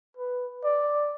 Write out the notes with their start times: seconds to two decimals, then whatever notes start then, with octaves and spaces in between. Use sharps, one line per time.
0.16 B4
0.64 D5